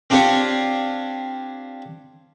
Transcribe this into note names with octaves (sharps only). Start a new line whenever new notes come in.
C4 D4 F4 G4 C5 C#5